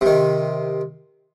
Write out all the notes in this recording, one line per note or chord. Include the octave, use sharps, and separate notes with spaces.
C3 D#3